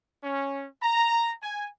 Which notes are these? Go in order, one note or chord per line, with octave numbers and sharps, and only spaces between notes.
C#4
A#5
G#5